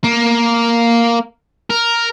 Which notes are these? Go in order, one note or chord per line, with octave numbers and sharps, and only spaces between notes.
A#3
A#4